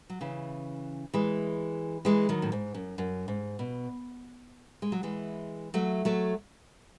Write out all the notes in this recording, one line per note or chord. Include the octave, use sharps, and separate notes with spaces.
F#3
C#3 E3
E3 G#3
E3 G#3
D#3 F#3
A2
G#2
F#2
F#2
G#2
B2
G#3
F#3
E3 G#3
F#3 A3
F#3 A3